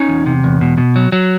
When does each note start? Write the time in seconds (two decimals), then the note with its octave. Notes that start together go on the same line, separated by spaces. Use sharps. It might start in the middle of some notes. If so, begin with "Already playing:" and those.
Already playing: C#4 D#4
0.08 E2
0.26 C3
0.44 E2
0.61 B2
0.78 B2
0.96 F#3
1.12 F#3